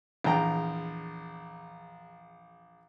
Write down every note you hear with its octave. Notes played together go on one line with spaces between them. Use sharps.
A#1 E2 G5 A#5